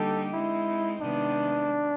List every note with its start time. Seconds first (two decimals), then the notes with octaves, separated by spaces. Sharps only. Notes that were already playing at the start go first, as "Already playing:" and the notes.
Already playing: D3 G3 A#3 D#4 G4 A4
0.34 G#3 C4 D#4 E4
1.01 C3 D#3 G#3 B3 D4